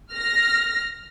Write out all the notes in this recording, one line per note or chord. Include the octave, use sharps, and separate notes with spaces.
F6 A#6